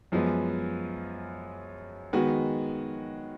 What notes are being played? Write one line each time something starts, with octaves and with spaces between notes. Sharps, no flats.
F#2 F3 G#3 B3
D#3 G#3 B3 F#4